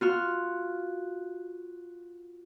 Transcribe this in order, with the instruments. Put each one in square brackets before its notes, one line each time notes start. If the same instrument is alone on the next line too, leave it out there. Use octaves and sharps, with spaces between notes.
[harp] F4 F#4 F6